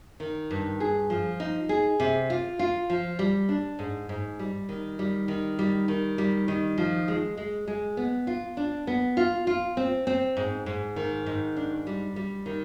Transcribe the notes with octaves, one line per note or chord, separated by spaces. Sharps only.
D#3
G2
G#4
F3
D#4
G#4
C3
F4
F4
F3
G3
D4
G#2
G#2
G3
D#3
G3
D#3
G3
D#3
G3
D#3
F3
G#3
G#3
G#3
B3
F4
D4
B3
F4
F4
C4
C4
G#2
G#2
D#3
G#2
D4
G3
G3
D#3